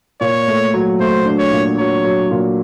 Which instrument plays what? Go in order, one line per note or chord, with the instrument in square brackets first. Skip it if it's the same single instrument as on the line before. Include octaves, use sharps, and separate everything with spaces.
[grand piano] A#2 [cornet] C#5
[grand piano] A3
F#3
[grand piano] A3 [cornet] C5
[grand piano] D4
[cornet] C#5
[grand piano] A#2
[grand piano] F#3 [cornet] C#5
[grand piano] F#3
A#2